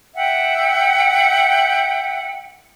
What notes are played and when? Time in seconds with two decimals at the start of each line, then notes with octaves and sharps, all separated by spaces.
0.15 E5 F#5 G5